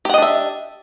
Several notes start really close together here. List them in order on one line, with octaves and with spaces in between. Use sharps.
G4 F#5 D#5 D4 E5